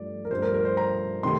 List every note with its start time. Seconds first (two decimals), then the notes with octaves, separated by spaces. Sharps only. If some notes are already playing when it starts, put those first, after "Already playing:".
Already playing: G2 F3 A3 D5
0.25 A#4
0.31 G2 F3 A3 C5
0.42 A#4
0.54 A#4
0.65 C5
0.77 A#5
1.23 C3 D#3 A3 C6